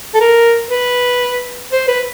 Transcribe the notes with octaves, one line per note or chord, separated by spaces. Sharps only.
A4
A#4
B4
C5
B4